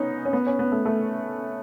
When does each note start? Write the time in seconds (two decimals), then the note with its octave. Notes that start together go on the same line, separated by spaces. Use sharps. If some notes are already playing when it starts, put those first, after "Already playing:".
Already playing: B3 C#4 D#4
0.25 C#4
0.33 B3
0.47 C#4
0.59 B3
0.72 A3
0.85 A3